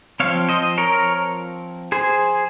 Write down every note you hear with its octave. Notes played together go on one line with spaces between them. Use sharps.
F3 C4 C#5 F5
C5 D#5
A#4 C#5
G#4 C5